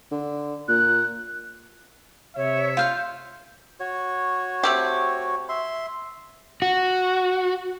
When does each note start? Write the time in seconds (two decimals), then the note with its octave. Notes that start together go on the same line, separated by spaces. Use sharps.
0.11 D3
0.68 A#2 F#6
2.36 C3 C#5 E5
2.77 F4 F5 C6 G6
3.80 F#4 C#5
4.63 A3 C4 G4
5.49 E5 C6
6.62 F#4